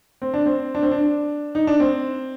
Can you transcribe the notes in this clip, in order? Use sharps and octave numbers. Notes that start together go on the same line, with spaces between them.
C4
D4
C4
D4
C4
D4
D#4
D4
C4